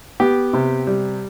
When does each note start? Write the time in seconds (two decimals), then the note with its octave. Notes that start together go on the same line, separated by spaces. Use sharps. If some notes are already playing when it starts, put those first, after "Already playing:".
0.20 B3 G4
0.53 C3
0.87 G3